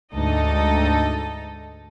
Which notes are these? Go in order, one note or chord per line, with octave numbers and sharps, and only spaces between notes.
D2 G#2 D#4 A4 D#5